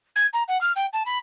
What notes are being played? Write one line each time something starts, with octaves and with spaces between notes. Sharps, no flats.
G#6
A#5
F#5
F6
G5
A5
B5